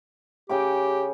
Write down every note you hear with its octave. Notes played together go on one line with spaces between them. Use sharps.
C#3 G4 G5 D6